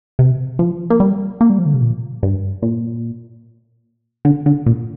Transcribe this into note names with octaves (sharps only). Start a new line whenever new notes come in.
C3
F3
A#3
G3
A#3
G3
F3
D3
C3
A#2
G2
A#2
D3
D3
A#2